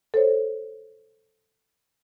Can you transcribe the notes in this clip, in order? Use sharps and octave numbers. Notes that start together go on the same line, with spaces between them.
A4 C5 C#5